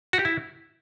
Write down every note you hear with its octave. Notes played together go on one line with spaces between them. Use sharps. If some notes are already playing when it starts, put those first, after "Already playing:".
F#4
G4
E4